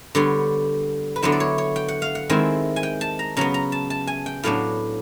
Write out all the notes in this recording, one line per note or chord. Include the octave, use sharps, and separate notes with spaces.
D3 G3 B3 C#5
B4
D3 F#3 B3 E4 C5
D5
C#5
C#5
G5
F#5
F5
F#5
D#3 G#3 C4 E4
G#5
G5
A5
A#5
C#3 F#3 B3 A#5
A#5
A5
A5
G#5
G5
A2 F#3 B3 D4 F5